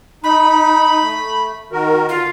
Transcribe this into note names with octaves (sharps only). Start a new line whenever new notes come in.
D#4 B5
A3
D#3 F#4 A#4
D3 F4